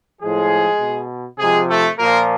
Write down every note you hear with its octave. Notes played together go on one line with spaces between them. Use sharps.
A2 F3 G#3 G#4
B2
C3 F3 G#3 G#4
A3 A4
A#2 F3 A#3 A#4